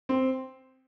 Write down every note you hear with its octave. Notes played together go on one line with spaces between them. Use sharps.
C4